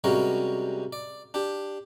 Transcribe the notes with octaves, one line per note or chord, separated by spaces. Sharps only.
C3 G3 G#3 C#4 F#4 A#4
D5
D4 G4